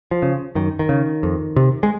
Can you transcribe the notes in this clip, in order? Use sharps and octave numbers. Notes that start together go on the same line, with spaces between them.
F3
C#3
F#2 D#3
D#3
C#3
F2
C3
G#3